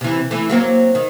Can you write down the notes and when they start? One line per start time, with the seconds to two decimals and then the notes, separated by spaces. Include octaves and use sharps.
0.01 C3 E3
0.31 E3 A3
0.50 F#3 A#3 C4
0.95 D#3